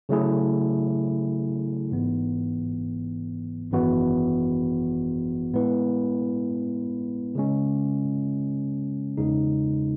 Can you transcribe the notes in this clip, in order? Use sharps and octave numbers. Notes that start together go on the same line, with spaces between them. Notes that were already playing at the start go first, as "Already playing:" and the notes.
C#3 F#3 A3 E4 G#4
G#1 G#2 E3 B3
G#1 F#2 E3 B3 F#4
A2 G#3 B3 E4 B4
C#3 G#3 C#4
E2 C#3 G#3 D#4